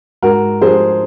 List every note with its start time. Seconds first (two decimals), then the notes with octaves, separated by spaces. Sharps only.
0.23 G#2 F#4 A#4
0.61 F3 G#3 G#4 C5